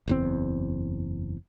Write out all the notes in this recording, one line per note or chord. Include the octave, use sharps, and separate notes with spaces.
F#1 E2 C4